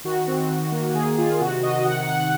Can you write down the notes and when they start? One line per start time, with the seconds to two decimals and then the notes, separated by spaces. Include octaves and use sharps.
0.04 D#3 F#4
0.27 C4
0.50 D#3
0.72 A#3
0.94 D#3 G#4
1.18 D#3 F4
1.40 C3 F#4
1.63 C3 D#5
1.85 D#3 F#5
2.08 D#3 F#5